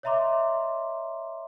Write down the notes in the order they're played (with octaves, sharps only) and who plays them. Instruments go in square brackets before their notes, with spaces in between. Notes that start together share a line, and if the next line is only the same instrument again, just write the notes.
[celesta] C#5 D#5 E5 A#5 C6 D6